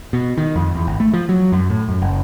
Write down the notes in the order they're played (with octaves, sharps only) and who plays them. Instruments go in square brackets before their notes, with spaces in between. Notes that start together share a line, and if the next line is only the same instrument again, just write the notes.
[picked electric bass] B2
D#3
F2
E2
G#1
A3
F3
F#3
F#2
A2
F#2
F#1